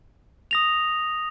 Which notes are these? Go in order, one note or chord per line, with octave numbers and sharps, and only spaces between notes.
D#6 A#6 F7